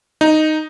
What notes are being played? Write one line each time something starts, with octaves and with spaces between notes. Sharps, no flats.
D#4